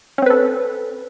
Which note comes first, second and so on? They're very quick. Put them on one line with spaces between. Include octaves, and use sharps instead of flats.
C#4 C4 B4 A4